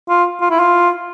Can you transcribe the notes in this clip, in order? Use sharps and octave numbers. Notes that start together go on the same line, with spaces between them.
F4
F4
E4
F4